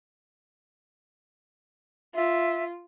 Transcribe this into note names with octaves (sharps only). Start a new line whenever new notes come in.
F4 E5